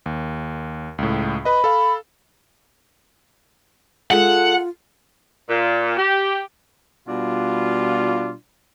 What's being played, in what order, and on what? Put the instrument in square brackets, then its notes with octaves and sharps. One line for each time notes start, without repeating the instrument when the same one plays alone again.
[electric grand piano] D#2
C#2 A2
[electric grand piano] B4 D#5 [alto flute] B5
[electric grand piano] A4 F5
[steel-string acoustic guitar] G#3 A4 [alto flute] F4 [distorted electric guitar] F#5
[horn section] A#2
G4
B2 G3 D4 F4